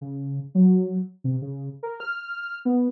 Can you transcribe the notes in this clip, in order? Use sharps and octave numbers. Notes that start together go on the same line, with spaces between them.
C#3
F#3
C3
C#3
A#4
F6
B3